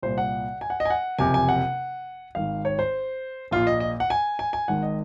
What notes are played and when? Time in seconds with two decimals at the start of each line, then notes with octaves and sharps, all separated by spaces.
0.02 C2 A#2 C5
0.18 F#5
0.61 G#5
0.70 F#5
0.80 D#5
0.85 G#5
0.90 F#5
1.19 F#1 F2 C3 G#5
1.34 G#5
1.49 F#5
2.35 G#1 G#2 D#3 F5
2.65 C#5
2.79 C5
3.51 A#1 A#2 F4
3.67 D#5
3.80 D#5
4.00 F#5
4.10 G#5
4.39 G#5
4.53 G#5
4.68 G#1 G#2 D#3 F#5
4.83 D#5